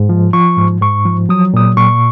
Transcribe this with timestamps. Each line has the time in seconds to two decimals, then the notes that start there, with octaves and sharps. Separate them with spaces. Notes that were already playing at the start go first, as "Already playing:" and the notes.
Already playing: G#2
0.09 F3
0.33 F3 C#6
0.57 G#2
0.82 G#2 C#6
1.06 F3
1.29 F#3 D#6
1.54 A#2 D#6
1.77 A#2 C#6